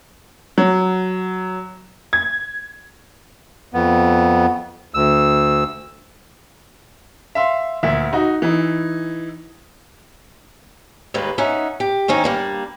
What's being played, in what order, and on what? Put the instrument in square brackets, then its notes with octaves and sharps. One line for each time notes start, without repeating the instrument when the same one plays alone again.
[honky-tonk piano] F#3
G#6
[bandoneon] F2 B3
D2 E6
[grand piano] E5 F5 C6
D2 A#2 E5
D#4 F#4
E3 D#4
[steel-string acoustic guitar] D#2 G3 G#3 A#3 B4
C#4 D#4 E5 F#5
G4
D#3 C4 C#4 D#4
G3 A#3 D4